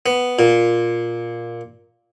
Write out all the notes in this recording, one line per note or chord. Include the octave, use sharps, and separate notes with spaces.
B3
A#2